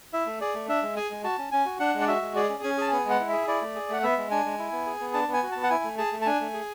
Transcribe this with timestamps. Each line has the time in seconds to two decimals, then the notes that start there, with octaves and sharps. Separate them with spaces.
0.13 E4 E5
0.26 A3
0.41 G#4 D5
0.54 A3
0.68 D4 E5
0.82 G#3
0.96 G#4 G#5
1.10 G#3
1.24 F#4 A5
1.38 C#4
1.52 C#4 G#5
1.66 F#4
1.80 D4 F#5
1.94 G#3
2.01 D5
2.08 F#4 E5
2.22 G#3
2.36 G#4 D5
2.49 C#4
2.63 C#4 G#5
2.78 G#4 A5
2.91 B3 G#5
3.05 G#3
3.10 F#5
3.20 E4
3.29 G#4 E5
3.47 E4 D5
3.62 A3
3.75 G#4
3.89 A3 F#5
4.03 B3 E5
4.17 G#3
4.31 D4 G#5
4.45 G#3
4.59 E4
4.72 B3
4.86 G#4
5.00 B3
5.14 D4 A5
5.28 B3
5.33 G#5
5.43 F#4
5.52 B3 A5
5.63 F#5
5.70 E4 G#5
5.84 A3
5.98 G#4 A5
6.12 A3
6.22 A5
6.26 D4 G#5
6.41 A3
6.54 G#4